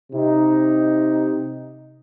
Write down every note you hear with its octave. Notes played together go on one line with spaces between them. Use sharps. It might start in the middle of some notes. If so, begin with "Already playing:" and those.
C3 D#4